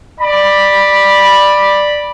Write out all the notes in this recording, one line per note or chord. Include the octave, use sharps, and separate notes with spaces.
D5 B5